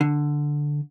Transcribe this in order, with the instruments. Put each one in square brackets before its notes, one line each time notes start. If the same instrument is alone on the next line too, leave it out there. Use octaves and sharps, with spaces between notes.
[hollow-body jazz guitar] D3